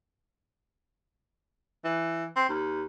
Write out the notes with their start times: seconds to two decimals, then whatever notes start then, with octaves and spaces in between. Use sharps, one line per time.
1.84 E3
2.36 C4
2.49 D#2